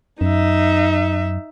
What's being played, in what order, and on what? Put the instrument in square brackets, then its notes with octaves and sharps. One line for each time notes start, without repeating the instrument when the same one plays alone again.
[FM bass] F#2 [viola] D#4 E5